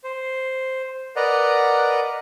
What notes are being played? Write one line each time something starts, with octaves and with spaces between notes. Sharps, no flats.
C5
A#4 B4 D5 D#5 F#5 A#5